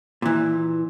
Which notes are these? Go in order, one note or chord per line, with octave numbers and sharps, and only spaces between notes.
A#2 E3